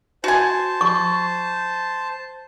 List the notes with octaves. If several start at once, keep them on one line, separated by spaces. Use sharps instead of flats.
F#4 C5 G#5 A5
C#6